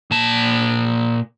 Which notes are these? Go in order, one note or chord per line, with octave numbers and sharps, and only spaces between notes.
A#2 A5